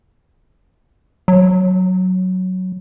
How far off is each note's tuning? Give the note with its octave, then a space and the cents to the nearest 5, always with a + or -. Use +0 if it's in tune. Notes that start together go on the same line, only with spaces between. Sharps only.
F#3 +0